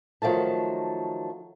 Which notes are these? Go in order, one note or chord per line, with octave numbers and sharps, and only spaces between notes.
D#3 F3 F#3 A3 A5